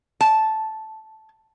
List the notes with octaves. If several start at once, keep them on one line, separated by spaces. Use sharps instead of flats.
A5